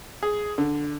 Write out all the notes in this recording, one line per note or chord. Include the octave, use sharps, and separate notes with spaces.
G#4
D3